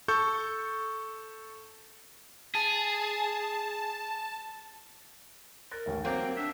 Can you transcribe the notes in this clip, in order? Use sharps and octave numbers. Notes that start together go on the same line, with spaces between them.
A4 C#6 G6
G#4 A5
A#4 F#6 A6 A#6
A1 D#2 A3
F#3 A#3 C4 C5 G5 D6
C4
D4 E5